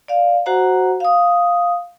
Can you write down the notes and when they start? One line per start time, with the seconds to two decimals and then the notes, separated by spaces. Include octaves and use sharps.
0.08 D5 F5
0.46 F#4 C5 F#5 A#5
1.00 F5 D#6